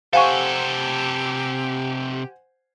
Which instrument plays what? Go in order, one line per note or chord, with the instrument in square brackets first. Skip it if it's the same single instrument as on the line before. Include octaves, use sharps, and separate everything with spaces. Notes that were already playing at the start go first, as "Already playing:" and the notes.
[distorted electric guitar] C3 A4 [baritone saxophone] G4 [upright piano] C5 F#5 G#5 [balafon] F5 C#6